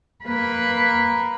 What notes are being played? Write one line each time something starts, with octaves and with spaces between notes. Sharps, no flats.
A#3 B4